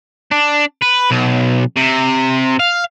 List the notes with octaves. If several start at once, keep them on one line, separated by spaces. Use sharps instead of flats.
D4
B4
B1
C3
F5